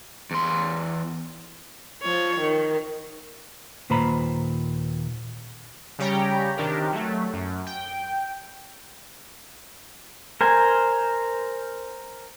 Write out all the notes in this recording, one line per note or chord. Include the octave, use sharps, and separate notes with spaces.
E2 C6
F3 C#5
D#3
D#2 A#2 B4 C5 A#5 B5
C#3 G3 G4 C#5 G5 A#5
C3 D#3 D4 G4 A#4
F#3 A3
F#2
G5
A#4 C5 G#5